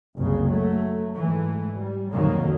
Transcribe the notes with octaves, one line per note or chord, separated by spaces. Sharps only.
F#1 C2 C#3
F#3 A3
G#2 E3 A3
G3
C2 F2 B2 D#3 F#3 A#3